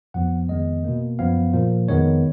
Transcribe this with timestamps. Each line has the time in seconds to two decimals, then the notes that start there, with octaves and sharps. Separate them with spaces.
0.14 F2 F3 B3 F#5
0.49 F2 D#3 G#3 B3 D#5
0.84 B2 A#3
1.19 F#2 F3 B3 F5
1.53 A#2 F3 A#3
1.88 F2 D#3 G#3 B3 C#5